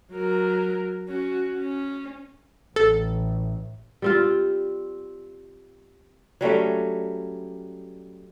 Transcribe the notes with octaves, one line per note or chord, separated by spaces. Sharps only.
F#3 A#4
C#4 F#4
C#4
A1 A4
G3 C4 F4
F#3 G3 A3 C#4